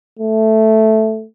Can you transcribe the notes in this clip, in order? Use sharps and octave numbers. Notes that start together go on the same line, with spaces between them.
A3